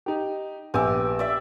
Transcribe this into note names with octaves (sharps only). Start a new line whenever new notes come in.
D#4 G4
A#1 B3 G4 G#5 D6 E6
D5 E5